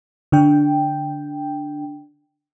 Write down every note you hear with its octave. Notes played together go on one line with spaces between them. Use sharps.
D3 D4 G5